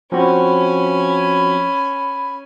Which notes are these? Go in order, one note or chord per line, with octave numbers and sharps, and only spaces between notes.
F3 C4 C#4 F#4 G#5 B5